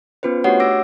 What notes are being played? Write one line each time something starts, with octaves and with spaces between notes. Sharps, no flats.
B3 C#4 F4 B4 C5
A3 D4 F#4 G4 C#5 F#5
D6 E6 A#6 D7